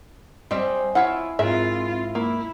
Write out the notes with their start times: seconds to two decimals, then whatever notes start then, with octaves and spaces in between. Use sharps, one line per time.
0.51 G3 C4 D#5 E5 G#5
0.95 E4 F4 C#5 E5 F#5
1.39 G#2 C4 F4 G#4 A#4 E5
2.15 A#3 E4